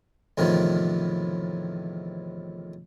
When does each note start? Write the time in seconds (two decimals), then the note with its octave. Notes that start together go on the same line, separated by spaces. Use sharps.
0.38 E2 A2 C3 D#3 F3